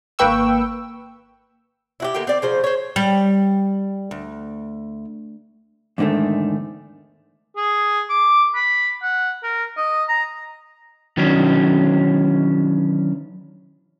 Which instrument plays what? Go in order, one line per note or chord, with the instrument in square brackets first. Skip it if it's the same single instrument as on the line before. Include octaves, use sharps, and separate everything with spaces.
[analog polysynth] G#1 A#3 B4 G5 C#6 E6
[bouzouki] E4 F#4 G4
D3 A#3 B3 G4
C4 D5
C#3 F3 C5
C5 C#5
[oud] G3
D2
[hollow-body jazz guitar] E2 G#2 D3 D#3 A3
[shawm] G#4
D6
B5
F#5
A#4
D#5
A#5
[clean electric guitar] D#3 E3 F#3 C#4 D4